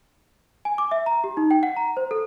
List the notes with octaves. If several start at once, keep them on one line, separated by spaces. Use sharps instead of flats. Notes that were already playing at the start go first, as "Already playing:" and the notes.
G#5
D6
E5
A#5
G4
D#4
G5
F#5
A#5
C5
A4